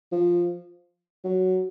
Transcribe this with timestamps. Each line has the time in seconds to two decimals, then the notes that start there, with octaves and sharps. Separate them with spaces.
0.12 F3
1.24 F#3